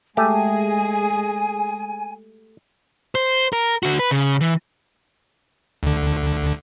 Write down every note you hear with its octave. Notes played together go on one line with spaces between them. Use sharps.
G#3 A3 G4 G#4 G#5
C5
A#4
D3 F#4
B4
C#3
E3
D2 D3